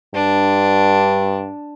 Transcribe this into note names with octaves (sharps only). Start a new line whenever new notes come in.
G2 D4